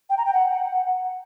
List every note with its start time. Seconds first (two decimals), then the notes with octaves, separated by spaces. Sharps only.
0.10 G5
0.18 A#5
0.25 G5
0.33 F#5